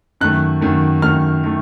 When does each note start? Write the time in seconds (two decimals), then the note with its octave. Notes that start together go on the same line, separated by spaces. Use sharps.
0.21 F#2 D#3 A3 F#6
0.61 F#2 D#3 A3
1.02 F#2 D#3 A3 F6
1.44 D#3 A3